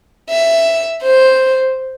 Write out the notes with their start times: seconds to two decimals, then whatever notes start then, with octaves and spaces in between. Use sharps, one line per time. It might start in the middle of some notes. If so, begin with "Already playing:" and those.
0.30 E5
1.02 C5